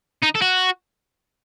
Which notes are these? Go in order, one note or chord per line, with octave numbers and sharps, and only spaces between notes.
D#4
A4
F#4